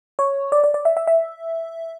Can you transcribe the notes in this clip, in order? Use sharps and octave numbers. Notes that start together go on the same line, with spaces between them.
C#5
D5
D5
D5
E5
E5
E5